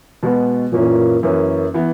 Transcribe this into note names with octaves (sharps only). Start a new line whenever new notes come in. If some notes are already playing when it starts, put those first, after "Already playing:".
B2 G#3 B3 F#4
F#2 A#2 E3 A#3 C#4
F#2 E3 A#3 C#4
E3 B3